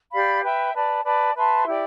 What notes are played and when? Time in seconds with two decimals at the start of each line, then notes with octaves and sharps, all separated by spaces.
0.12 G4 D5 F5 B5
0.43 B4 E5 G5
0.73 B4 D5 A5
1.04 B4 D5 A5
1.35 B4 E5 A5 C6
1.66 E4 G4 D5 G5